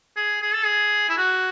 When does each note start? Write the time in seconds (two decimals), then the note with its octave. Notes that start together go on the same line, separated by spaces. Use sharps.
0.16 G#4
0.42 G#4
0.54 A4
0.65 G#4
1.09 E4
1.18 F#4